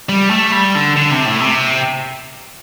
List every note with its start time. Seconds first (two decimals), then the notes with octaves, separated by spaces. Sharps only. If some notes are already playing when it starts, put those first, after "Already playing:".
0.09 G3
0.30 A3
0.52 G3
0.75 D3
0.96 D3
1.11 C3
1.26 A2
1.40 C3